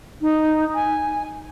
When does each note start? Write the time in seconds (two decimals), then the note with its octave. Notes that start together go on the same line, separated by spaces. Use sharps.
0.22 D#4
0.75 G#5